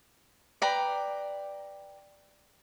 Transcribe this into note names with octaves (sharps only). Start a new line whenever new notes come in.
B4 D5 G5 A#5